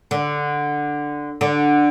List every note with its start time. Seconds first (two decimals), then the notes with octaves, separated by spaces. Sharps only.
0.11 D3
1.41 D3